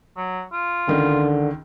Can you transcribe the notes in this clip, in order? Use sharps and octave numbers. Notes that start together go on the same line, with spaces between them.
F#3
F4
C#2 D3 D#3